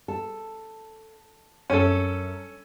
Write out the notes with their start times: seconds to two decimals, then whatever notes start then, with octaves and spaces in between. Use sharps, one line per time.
0.08 A4
1.70 F#2 C#4 A4